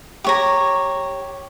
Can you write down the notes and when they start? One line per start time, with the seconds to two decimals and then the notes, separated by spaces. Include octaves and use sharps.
0.24 G4 C#5 A#5